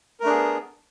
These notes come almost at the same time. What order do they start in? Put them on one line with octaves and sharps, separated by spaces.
A#4 A3 D4 G#4 B3